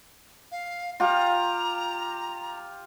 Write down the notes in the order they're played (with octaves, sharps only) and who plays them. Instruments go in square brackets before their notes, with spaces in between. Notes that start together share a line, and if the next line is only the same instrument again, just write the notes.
[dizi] F5
[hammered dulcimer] F4 G4 F5 [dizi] A#5